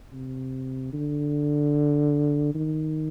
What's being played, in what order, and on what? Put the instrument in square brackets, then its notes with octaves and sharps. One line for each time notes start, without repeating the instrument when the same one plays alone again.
[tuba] C3
D3
D#3